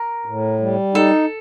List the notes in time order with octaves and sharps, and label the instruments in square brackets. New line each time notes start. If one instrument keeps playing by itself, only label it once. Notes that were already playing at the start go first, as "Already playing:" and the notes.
Already playing: [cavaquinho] A#4
[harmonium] A2
G3
[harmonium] D#4 [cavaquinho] A4